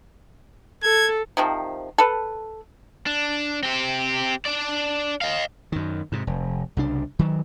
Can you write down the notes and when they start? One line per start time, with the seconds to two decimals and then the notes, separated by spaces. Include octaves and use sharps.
0.83 A4 G#6
1.37 C3 D#3 F3
1.98 A4 B4
3.07 D4
3.63 C4 G4
4.46 D4 D5
5.22 D#5 F5
5.72 F#2 D#3
6.12 G#2 C3
6.27 F1
6.77 C2 C#3 D4
7.19 D#3 F#3